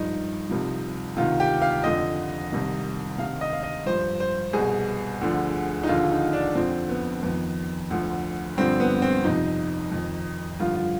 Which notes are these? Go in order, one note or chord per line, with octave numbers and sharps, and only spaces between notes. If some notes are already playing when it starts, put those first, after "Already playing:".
Already playing: G2 F3 D#4
C2 C3 F3
D2 C3 D#3 F4
G4
F5
F2 D3 F3 D#5
C2 C3 D#3
D2 C3 D#3 F5
D#5
F5
D#5
G2 F3 C5
C5
C2 B2 G#4
D2 D3 F3
D#4
D#2 D3 F3 F4
D#4
D4
F2 D3 F3 C4
B3
F2 D#3 B3
D2 D3 F3
G2 D3 F3 C4
B3
C4
F2 C3 F3 D#4
F2 D#3
G2 D3 F3 F4
F4